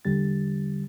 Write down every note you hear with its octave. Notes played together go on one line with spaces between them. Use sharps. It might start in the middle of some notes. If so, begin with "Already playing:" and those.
E2 D3 G3 A6